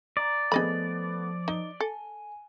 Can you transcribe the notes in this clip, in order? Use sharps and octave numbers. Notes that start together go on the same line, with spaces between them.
D5 A#5
F3 A3 B3 G#4 D#5 B5
D#4 G7
A4 G#5